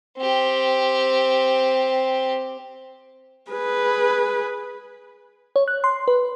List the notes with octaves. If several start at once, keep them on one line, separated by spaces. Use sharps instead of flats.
C4 G4
G#4 B4
C#5
F#6
C6
B4